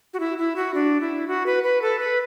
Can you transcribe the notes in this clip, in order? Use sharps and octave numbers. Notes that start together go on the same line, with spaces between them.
F#4
E4
E4
F#4
D4
E4
F#4
B4
B4
A4
B4